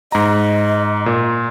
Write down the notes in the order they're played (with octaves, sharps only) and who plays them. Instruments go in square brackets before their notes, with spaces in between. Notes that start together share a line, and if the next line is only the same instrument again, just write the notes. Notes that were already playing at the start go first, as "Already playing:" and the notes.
[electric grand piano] G#2 A#5 [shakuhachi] D#5
[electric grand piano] A#2